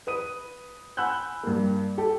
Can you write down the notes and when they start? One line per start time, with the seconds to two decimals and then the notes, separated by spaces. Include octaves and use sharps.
0.07 B4 D#6 D#7
0.97 F#5 G#5 B5 E6 F#6 G6
1.43 G2 A#3
1.98 G4 A4 G5